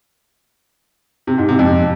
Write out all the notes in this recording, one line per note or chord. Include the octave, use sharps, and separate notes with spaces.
C3
G#2
C3
F2